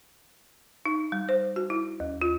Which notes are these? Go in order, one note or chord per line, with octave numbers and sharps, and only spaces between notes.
D#4
G3
C5
F#4
E4
D#2
F4